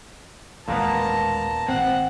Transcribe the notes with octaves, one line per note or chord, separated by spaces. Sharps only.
A1 D#2 A#2 G#3 A#3 B3 A5 A#5
G#1 C4 F#5